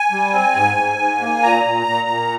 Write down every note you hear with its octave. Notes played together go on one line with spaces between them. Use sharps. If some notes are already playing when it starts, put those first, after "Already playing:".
Already playing: G#5
G3
C4
G#2
G#2
G#2
A#3
A#2 A#5
A#2
A#2
A#2